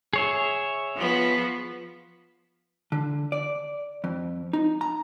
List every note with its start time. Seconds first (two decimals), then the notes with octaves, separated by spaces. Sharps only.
0.13 G#4 C#5 E5
0.96 F3 B3
2.92 D3
3.32 D5
4.04 F2
4.53 D#4
4.81 A#5